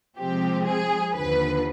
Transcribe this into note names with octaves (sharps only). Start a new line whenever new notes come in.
C3 F3 G#3 C4 G4
G#4
D#2 D3 F3 B4